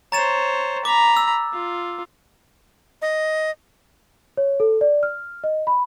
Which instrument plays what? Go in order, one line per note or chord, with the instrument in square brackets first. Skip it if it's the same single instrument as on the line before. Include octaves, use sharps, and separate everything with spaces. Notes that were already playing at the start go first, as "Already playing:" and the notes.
[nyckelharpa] C5 C#5 [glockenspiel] A#5 A6 E7
[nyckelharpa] A#5 B5 [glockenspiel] D6
[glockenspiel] E6
[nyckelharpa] F4
[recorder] D#5
[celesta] C#5
A4
D5
F6
D#5
B5